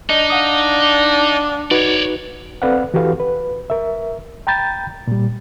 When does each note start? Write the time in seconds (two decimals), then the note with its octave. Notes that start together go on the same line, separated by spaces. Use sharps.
0.10 D4 D#4 D#5
0.30 F5 F#5 D#6
1.71 D#4 F#4 B4 C#5 D5
2.62 C4 A4 B4 D5 F5 F#5
2.94 E3 F#4 G4 A4 B4 F5
3.20 B4
3.70 A#4 E5
4.47 G5 A#5 B5 G6 A6
5.07 A#2 G3